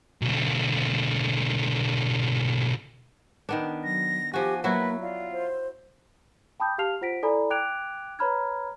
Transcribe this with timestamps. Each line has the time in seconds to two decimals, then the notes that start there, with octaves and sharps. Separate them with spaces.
0.22 B1 D3
3.49 D#3 B3 D4
3.84 F#3 A#6
4.33 F3 F#4 G4 G#5
4.64 F#3 A#3 E4 F#4 B4
5.01 F4 D5
5.32 C5
6.60 G5 A5 B5 D6 D#6 G6
6.78 G4 F5 A5 F6 C7 F7
7.01 F4 C5 F#5 A#6 B6 D7
7.23 E4 A4 D5 G#5 A#5 B5
7.50 G5 D6 F#6 G#6 D7 F7
8.19 B4 C#5 A#5 B5 F6 G#6